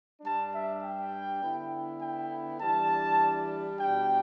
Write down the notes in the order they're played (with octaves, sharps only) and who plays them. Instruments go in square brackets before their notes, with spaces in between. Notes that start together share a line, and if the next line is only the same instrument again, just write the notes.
[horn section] G2 G3 D4 A5
E5
G5
D3 B3 E4
G5
E3 G3 D4 A5
B2 G3 D4 G5